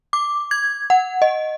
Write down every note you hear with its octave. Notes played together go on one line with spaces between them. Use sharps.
D6
G#6
F#5
D#5